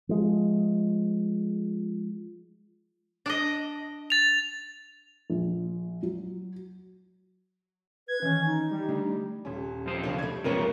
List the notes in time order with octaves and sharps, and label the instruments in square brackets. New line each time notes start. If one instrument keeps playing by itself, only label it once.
[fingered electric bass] F3 G#3
[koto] D4 D#5
[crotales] A6 F7
[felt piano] A#1
F#3
[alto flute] B4 [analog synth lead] G#6
[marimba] D#3 E3 [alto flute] C#4
[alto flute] D#4
[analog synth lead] G3
[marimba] D3 A3 D4
[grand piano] D#1 C#4
[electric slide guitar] F#2 F3 C5
[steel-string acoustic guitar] C#3 D4
[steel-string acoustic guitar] G3 A3 [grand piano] G#6
[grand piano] C#2 F#2 C#3 [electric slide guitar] F3 B3 [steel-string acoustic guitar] G3 A#4 C#5